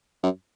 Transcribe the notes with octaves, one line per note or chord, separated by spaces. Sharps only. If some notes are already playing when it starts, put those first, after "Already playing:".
F#2